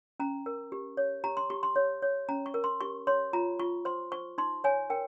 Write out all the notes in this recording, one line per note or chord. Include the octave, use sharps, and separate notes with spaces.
C#4 A#5
A#4
G4
C#5
G4 A#5
C6
G4 C#6
C6
C#5
C#5
C#4 A#5
C#6
A#4
C6
G4 C#6
C#5 C6
F4 A#5
F4 C#6
C5 C6
C5 C#6
D#4 C6
C#5 G#5
A#4 G5